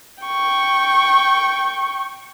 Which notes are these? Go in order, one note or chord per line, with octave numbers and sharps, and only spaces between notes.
G5 C#6